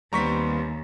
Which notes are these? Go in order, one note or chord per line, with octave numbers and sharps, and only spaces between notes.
D#2 G3 B3 C4 A#5 C#6 B6